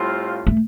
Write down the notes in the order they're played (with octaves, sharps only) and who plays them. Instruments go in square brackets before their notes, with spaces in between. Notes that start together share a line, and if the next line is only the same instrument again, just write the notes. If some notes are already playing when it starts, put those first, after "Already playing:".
Already playing: [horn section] A2 G3 C4 F4
[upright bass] A3